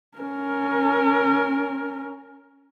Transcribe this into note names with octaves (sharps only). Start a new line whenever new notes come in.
C#4 A#4